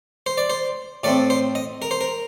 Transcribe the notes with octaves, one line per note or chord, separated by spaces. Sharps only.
C5
D5
C5
A2 A3 C4 D5
C5
D#5
A#4
C5
A#4